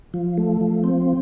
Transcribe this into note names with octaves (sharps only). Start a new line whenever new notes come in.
F3
A3
F3
C4